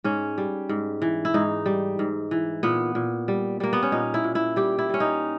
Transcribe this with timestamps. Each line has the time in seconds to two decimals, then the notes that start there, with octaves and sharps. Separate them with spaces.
0.04 G#2 C#4
0.38 G3
0.69 G#2
1.02 E3
1.25 E4
1.34 G#2 D#4
1.66 G3
1.99 G#2
2.31 E3
2.63 A#2 B3
2.95 A#2
3.28 G3
3.60 G3 A#3
3.73 B3
3.83 C#4
3.92 A#2 D#4
4.14 E4
4.24 A#2
4.35 E4
4.56 G3 G4
4.79 E4
4.89 G3 C#4
5.00 D#4